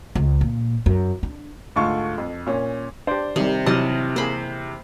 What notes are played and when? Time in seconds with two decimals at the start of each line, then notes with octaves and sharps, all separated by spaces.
0.15 C#2
0.41 A#2
0.86 F#2
1.23 D4
1.76 D2 G#2 A3 F4 C#6
2.18 F2
2.47 A#2 C#4
3.07 D4 G4 C5 D5
3.36 C3 D#3 G3
3.66 C3 E3 F#3 D#5 A5 F6
4.16 A#3 G#4 C5 B5